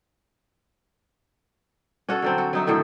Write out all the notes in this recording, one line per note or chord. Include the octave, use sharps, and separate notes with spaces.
C#4 F#4 A4
D3 F#3 C4
F#4
F#3 D#4 E5
A2 D3 D#3 E5